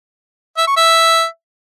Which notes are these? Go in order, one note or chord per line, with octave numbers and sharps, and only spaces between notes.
E5
C#6
E5